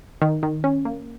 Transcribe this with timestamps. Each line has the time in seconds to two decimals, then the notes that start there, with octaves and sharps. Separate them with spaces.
0.22 D#3
0.43 D#3
0.64 C#4
0.85 A#3